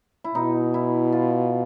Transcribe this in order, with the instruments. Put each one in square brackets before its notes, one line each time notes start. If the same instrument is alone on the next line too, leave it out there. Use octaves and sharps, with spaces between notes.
[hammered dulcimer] E4
[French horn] B2 [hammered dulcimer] D#4
[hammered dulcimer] E4
F4